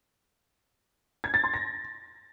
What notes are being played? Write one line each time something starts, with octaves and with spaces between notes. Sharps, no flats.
G#6
A6
C6
A#6